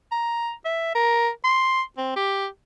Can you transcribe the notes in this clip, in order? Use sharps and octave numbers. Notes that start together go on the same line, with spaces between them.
A#5
E5
A#4
C6
C4
G4